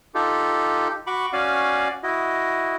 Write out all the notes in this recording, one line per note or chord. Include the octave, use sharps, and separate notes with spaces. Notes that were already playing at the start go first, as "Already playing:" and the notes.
D#4 F4 G4 A4
F#4 B5 C#6 D6
C#4 F#4 D5 F5 G#5
E4 F#4 D#5